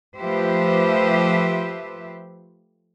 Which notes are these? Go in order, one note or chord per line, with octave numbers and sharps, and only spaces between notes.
F3 A3 G4 B4 C5 E5